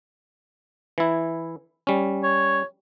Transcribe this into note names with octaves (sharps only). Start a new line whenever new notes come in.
E3 E4
G3 C#4
C#5